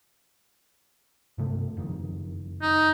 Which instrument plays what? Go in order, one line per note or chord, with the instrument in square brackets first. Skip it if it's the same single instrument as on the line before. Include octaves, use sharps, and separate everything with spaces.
[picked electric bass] G2 C3 A3
F#1 F2 D#3
[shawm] D#4